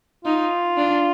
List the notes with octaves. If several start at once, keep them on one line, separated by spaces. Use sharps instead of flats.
D#4 F4
D4